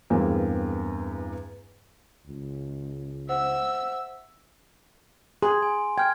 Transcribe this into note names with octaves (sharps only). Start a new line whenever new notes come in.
E2 G2 G#3 A#3 C4
C#2
C5 E5 F#5 E6
G#4 C6
G#5
G5 F6 G#6